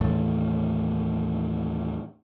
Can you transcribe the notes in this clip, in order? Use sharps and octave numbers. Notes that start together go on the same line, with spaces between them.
D#2 A2 E3 A3